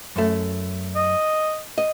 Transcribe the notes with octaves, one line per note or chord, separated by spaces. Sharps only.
F#2 A3
D#5
D#5